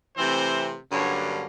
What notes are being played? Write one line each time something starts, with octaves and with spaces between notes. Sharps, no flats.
C3 E3 A3 C4 C5
G2 D3 F#3 A#3 C#4 C#5